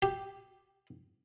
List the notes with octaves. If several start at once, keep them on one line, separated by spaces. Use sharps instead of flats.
G4